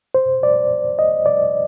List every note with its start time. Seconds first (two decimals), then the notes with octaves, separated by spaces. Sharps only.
0.15 C5
0.43 D5
0.99 D#5
1.26 D5